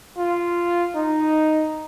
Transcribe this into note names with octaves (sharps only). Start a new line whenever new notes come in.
F4
D#4